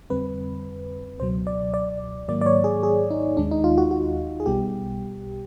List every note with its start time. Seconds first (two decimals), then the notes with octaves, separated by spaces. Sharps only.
0.10 F2 D3 G3 C4 B4
1.18 C#2 B2 F#3 C5
1.47 D5
1.74 D5
2.28 G#2 D#3 F#3 A#3 D5
2.41 D5
2.46 C#5
2.64 G#4
2.83 G#4
3.10 D#4
3.37 D#2 D#3 G#3 D4
3.51 D#4
3.64 F4
3.78 F#4
3.91 F#4
4.40 G#4
4.46 B1 B2 G3 B3 G4